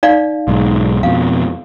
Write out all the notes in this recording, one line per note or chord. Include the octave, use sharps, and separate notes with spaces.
D#4 D5 F5
B1 G#2
F2 B2 F5